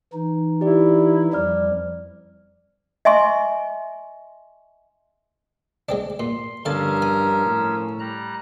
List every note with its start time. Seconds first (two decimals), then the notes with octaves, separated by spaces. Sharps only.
0.13 E3 D#4
0.61 E4 G4 D5
1.33 F2 F3 G3 D5 F6
3.05 D#5 E5 G#5 C6 C#6
5.89 G#3 C4 D4
6.20 A#2 C6
6.65 G2 D3 F3 C#4 A#4 F5 A5 E6
7.02 G#5
7.46 A2
8.00 G3 A#5 F#6